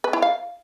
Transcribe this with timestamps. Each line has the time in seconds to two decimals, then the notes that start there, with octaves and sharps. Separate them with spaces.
0.04 B4
0.13 E4
0.22 F5